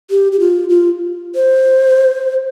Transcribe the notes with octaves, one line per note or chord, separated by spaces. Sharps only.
G4
G4
F4
F4
C5